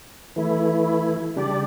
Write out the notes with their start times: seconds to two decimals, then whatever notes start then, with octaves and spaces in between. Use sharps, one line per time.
0.36 E3 A3 E4
1.36 C#3 G3 D4 G4 D5